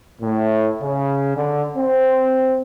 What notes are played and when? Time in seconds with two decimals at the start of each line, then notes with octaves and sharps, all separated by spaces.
0.22 A2
0.82 C#3
1.37 D3
1.77 C4